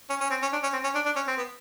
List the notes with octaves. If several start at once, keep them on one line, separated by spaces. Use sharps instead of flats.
C#4
C#4
C4
C#4
D4
C#4
C4
C#4
D4
D4
C#4
C4
B3